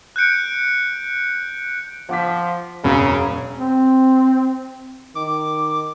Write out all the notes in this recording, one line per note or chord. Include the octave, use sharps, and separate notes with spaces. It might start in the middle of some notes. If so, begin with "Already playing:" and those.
F#6 G6 C#7 D7
F3 F#5 D6 B6
E1 F#2 C#3 B5
C4
D#3 D6